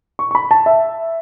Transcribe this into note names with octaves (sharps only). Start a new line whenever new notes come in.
C#6
C#6
B5
A5
E5